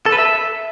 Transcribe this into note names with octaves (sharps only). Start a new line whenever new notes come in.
A4
B4
E5